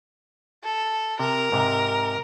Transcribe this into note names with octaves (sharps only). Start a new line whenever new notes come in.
A4
C3 A#4
G#2 C3